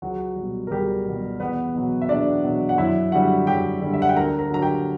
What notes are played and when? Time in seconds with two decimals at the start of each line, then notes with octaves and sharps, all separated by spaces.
0.02 C#2 F#3 F#4
0.36 G3
0.41 B2
0.67 A#4
0.71 C#2 G3 G4
1.06 B2 G3
1.40 E2 B3 B4
1.75 B2 F#3
2.02 E5
2.09 E2 D4 D5
2.44 B2 F#3
2.69 F#5
2.78 F#2 E4 E5
3.12 D3 G3 F#4 F#5
3.47 F#2 G4 G5
3.81 D3 G3
3.94 E5
4.02 F#5
4.09 G5
4.16 D2 A#4 A#5
4.39 A#4 A#5
4.51 D3 F#3 A#5
4.62 G4 G5